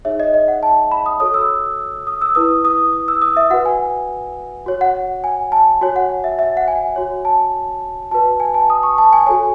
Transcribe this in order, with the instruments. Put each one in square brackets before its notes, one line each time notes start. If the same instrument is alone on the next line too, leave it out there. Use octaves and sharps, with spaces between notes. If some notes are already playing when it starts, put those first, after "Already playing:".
[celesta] D#4 G#4 C#5 E5
D#5
D#5
F#5
A5
B5
D#6
F#4 A4 C#5 D#6
E6
D#6
E6
E4 B4 D#6
D#6
D#6
E6
D#6
E5
F#4 B4 F#5
G#5
F#4 C#5
F#5
G#5
A5
F#4 C#5 G#5
F#5
E5
E5
F#5
G#5
F#4 C#5
A5
F#4 B4 A5
G#5
A5
D#6
C#6
A5
G#5
F#4 A4 C#5 G#5